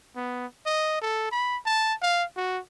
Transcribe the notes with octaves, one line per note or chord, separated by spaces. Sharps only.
B3
D#5
A4
B5
A5
F5
F#4